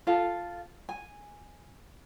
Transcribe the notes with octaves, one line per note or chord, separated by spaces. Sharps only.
F4 A4 F5 A5
G#5